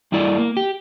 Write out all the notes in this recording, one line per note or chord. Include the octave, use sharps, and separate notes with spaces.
G2 G3 E4 D5
A#3
G4